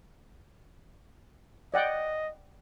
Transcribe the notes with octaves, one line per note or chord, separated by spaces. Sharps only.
D5 D#5 F#5 G5